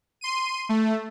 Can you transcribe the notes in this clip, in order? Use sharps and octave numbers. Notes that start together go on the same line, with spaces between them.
C6 D#7
A3